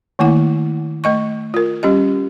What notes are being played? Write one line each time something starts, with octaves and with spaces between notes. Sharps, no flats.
D#3 A3 A#3 E4 F#5
A3 D#5 C#6
F4 A#4
G3 C#4 G4 D#5